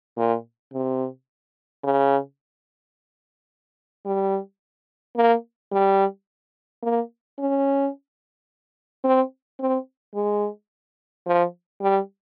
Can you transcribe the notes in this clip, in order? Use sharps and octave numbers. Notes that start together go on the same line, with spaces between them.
A#2
C3
C#3
G3
A#3
G3
A#3
C#4
C4
C4
G#3
F3
G3